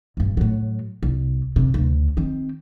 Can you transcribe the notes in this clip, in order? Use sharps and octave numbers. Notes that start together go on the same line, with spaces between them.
D#1 G2
A2 F#3
C2
C3
D2 C#3
D#3 C4